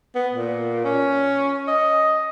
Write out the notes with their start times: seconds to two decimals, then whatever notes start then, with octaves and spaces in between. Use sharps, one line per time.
0.15 B3
0.33 A#2
0.85 C#4
1.68 D#5